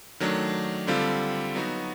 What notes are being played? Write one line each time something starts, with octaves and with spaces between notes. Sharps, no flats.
D#3 F#3 A3 D4
D3 G3 C4 F4 A4
F#3 B3 D#4 F#4